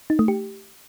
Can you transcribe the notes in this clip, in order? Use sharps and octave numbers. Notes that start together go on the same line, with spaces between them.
D#4
A3
G4